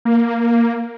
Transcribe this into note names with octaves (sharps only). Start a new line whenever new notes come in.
A#3